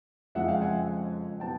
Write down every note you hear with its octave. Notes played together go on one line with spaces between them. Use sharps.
F2 C#3 F3 G#3 C4 E5 F#5
F5 G5
F#5 G#5
B2 F#3 B3 G5 A5